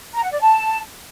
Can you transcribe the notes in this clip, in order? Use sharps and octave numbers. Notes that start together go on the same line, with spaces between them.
A#5
F#5
D5
A5